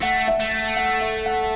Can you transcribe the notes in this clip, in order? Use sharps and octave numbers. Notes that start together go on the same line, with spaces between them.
A3 F#5
E5
A3
F#5
E5
F#5